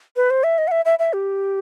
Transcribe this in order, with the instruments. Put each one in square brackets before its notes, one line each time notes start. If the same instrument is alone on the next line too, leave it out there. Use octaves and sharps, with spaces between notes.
[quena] B4
C5
E5
D#5
F#5
E5
E5
E5
G4